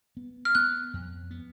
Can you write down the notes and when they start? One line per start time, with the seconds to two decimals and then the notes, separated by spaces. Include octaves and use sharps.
0.17 B3
0.45 F6
0.55 B3 F#6
0.94 F2
1.31 B3